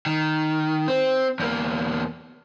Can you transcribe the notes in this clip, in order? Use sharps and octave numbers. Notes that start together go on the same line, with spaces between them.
D#3
C4
E2 A#3